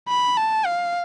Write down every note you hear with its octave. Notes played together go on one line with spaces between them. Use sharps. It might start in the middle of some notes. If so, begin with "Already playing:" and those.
B5
A5
F5